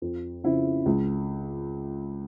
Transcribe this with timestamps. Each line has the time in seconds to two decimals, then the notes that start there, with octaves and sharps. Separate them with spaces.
0.02 F2
0.44 C#3 F3 C4 E4
0.86 C#2